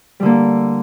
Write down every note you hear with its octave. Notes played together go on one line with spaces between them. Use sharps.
D3 G3 A#3